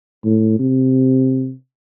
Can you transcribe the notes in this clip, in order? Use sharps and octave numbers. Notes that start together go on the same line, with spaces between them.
A2
C3